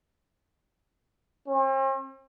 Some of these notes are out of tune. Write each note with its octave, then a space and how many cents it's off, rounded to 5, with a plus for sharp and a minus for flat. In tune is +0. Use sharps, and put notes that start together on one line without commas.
C4 +45